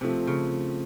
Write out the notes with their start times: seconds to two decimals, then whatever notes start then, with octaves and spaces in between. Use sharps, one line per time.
0.01 C3 F3 A3 C4
0.27 C#3